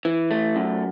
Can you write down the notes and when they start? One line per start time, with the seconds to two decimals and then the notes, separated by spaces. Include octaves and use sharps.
0.05 E3
0.31 A3
0.56 F#2